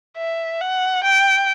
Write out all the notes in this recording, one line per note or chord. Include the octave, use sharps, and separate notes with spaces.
E5
F#5
G5